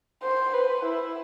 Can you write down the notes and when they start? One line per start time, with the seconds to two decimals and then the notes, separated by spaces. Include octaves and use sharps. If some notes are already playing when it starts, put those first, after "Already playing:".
0.23 C5
0.53 B4
0.85 E4